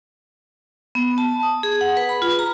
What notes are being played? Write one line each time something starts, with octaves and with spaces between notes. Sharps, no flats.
B3
A5
D#6
G#4
F#5
B4
B5
F4
A#5